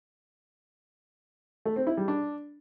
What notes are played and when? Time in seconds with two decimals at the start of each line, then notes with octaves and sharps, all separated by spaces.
1.65 A3
1.76 C4
1.87 E4
1.97 G3
2.08 D4